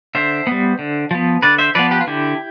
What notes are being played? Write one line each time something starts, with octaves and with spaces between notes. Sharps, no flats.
D3 C5 E5
G3 B3
D3
F3 B3
D3 B4 D5
C5 E5
F3 B3 B4 D5
G4 B4
F4
D3 E4 G4